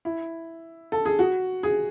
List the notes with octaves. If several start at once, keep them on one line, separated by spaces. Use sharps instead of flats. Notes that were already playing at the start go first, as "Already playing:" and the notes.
E4
A4
G#4
F#4
G#4